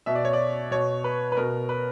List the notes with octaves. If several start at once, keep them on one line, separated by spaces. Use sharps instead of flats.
B2 E5
D5
C#5
D5
B2 C#5
B4
B4
B2 A#4
B4